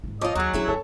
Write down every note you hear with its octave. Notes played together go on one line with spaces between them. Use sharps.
G#1 E4
F3 F4 C#5 D#5 D6
D#2 F#3 D#4 G#4
G#2 C#4 D4 E4 G#4
F#2 A4 C#5 A5